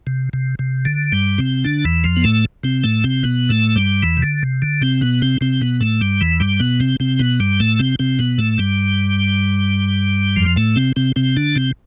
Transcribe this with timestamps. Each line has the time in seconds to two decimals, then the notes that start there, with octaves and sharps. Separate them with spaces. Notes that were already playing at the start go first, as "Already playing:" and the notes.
0.07 C3
0.33 C3
0.59 C3
0.85 D3
1.12 G2 G3
1.38 C3 C4
1.64 D3 D4
1.84 E2 E3
2.04 F2 F3
2.16 B3
2.24 A2 A3
2.64 C3 C4
2.84 A2 A3
3.04 C3 C4
3.23 B2 B3
3.49 A2 A3
3.76 G2 G3
4.03 E2 E3
4.17 C3
4.22 D3
4.43 C3
4.62 D3
4.81 C3 C4
5.01 B2 B3
5.22 C3 C4
5.41 C3 C4
5.61 B2 B3
5.81 A2 A3
6.01 G2 G3
6.21 E2 E3
6.40 G2 G3
6.60 B2 B3
6.80 C3 C4
7.00 C3 C4
7.19 B2 B3
7.40 G2 G3
7.60 A2 A3
7.79 C3 C4
7.99 C3 C4
8.19 B2 B3
8.38 A2 A3
8.58 G2 G3
10.36 F2 F3
10.56 A2 A3
10.76 C3 C4
10.96 C3 C4
11.16 C3 C4
11.37 D3 D4
11.56 C3 C4